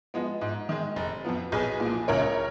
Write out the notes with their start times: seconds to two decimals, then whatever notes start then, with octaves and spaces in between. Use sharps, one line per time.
0.14 F3 G#3 B3
0.41 G#2
0.69 D#3 G#3
0.96 F1
1.25 F2 F3 B3
1.52 B1 G#4 B4
1.80 A#2
1.85 F3
2.08 C#2 A#4 C#5